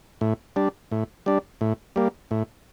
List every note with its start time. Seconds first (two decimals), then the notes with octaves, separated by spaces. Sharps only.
0.21 A2
0.56 G3 D4
0.92 A2
1.26 G3 D4
1.61 A2
1.96 G3 A#3
2.31 A2